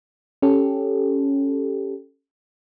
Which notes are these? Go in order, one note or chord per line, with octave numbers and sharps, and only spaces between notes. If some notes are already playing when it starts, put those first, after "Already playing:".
C#4 G4 A4